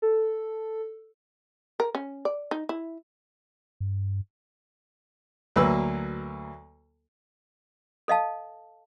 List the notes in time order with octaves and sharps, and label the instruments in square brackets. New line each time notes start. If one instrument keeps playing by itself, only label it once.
[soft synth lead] A4
[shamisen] A#4
C#4
D5
D#4
E4
[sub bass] G2
[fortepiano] D2 F#3 A#3 B4 E6
[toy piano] A4 D#5 F5 A5